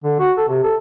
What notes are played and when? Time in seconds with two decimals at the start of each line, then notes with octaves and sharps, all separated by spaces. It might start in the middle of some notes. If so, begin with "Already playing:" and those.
0.04 D3
0.19 F#4
0.37 A4
0.48 C3
0.63 A4